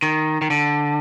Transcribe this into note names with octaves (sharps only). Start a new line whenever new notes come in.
D#3
D#3
D3